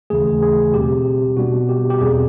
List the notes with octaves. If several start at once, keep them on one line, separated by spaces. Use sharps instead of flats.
D#2 C#3 E3 A3 G#4
G#4
B2 G3 C4 G4
B2 G3 B3 D4 F#4
G4
G4
E2 B2 G3 C4 G#4